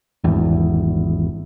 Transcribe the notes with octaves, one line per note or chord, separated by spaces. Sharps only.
G#1 E2